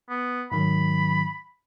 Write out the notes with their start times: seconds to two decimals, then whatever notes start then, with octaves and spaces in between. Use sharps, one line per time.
0.10 B3
0.52 G#2 D#3 F#3 B5